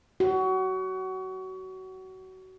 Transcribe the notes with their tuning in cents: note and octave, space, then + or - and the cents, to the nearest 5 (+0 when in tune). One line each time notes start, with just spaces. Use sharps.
F#4 +25